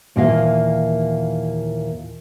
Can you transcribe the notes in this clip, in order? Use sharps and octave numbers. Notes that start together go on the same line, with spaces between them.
D#2 A#2 E3 A#3 D#5 F5